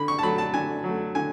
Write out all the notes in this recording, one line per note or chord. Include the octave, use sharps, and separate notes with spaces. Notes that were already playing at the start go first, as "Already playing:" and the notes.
Already playing: D3 B5
C#6
A5
F#3 A3 B5
A5
D3 G#5
F#3 A3
D3 G#5